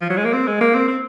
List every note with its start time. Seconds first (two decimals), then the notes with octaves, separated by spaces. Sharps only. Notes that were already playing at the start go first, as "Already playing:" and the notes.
0.01 F3
0.09 F#3
0.17 G#3
0.25 A#3
0.33 C4
0.47 G#3
0.61 A#3
0.75 C4
0.88 C4